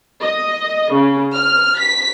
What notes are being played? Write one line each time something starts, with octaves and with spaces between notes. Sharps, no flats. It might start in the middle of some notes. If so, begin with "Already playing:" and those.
D#5
C#3
F6
B6